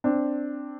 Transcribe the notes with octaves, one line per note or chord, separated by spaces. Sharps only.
C4 D4